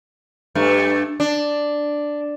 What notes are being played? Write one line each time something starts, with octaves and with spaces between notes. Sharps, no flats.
G2 A3
D4